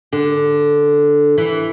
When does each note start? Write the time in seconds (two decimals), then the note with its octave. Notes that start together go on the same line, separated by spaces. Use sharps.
0.13 D3
1.38 E3